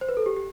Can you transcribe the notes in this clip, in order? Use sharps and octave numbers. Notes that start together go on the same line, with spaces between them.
C5
B4
A4
G4
G4